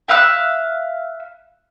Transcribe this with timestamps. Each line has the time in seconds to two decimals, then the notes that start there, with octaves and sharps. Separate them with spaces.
0.08 E5 F5 E6 F#6